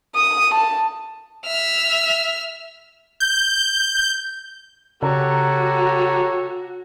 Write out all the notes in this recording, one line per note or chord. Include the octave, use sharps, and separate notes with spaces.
D#6
A5
E5 F6
G6
C#3 F#4 G4 A4 C#5 A#5